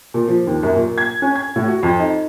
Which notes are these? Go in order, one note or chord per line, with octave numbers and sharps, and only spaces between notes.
A#2
F3
D#2
F#2
A#2
G#6
C#4
G#6
A2
F#4
F2
D#4